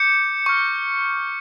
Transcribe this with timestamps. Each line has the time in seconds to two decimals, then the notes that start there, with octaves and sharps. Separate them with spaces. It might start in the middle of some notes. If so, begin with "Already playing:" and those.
Already playing: D6 G6 C#7
0.46 C#6 F6